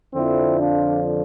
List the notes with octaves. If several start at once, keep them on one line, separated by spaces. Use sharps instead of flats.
F2 D3 F3 C4 E4
D4 F4